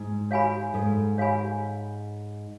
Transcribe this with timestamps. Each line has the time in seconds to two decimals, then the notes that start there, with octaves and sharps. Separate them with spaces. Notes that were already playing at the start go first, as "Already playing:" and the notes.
Already playing: G#2
0.31 C#5 F5 G#5 B5
0.74 G#2 A4
1.18 C#5 F5 G#5 B5